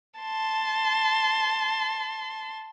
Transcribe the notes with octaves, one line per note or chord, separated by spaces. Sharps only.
A5 C6